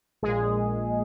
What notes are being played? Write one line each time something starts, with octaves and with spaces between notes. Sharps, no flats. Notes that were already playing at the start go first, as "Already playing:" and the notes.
A#1 A#2 G#3 G#4